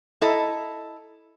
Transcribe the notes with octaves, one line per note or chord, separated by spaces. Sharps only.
E4 A4 D#5 A#5